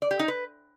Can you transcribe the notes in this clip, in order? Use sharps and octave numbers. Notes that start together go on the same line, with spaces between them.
D5
G4
D#4
B4